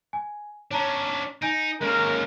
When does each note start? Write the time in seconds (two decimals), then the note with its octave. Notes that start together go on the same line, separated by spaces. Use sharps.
0.13 G#5
0.71 C#4 D4 C#5 A5 A#5
1.42 D#4 G#5 G6 D7
1.81 G#3 A#3 C#4 A#4